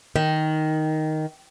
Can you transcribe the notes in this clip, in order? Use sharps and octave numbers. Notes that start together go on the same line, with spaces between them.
D#3